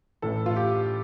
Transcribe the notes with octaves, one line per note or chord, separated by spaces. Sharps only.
A1 A2 E3 A3 A4
F4
G4